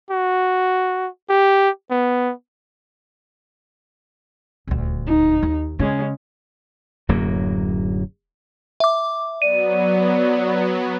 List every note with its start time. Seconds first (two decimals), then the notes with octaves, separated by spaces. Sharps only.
0.11 F#4
1.29 G4
1.91 B3
4.67 D#1 D2
5.07 D#4
5.43 D#2
5.79 C#3 G#3 C#4
7.09 D1 F#2 F#3 A#3
8.80 E5 D6
9.42 F#3 B3 D5 D#7